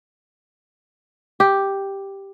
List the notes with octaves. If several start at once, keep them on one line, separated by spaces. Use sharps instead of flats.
G4